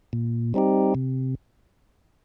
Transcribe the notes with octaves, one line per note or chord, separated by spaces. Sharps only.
A#2
G3 C4 D#4 G4
C3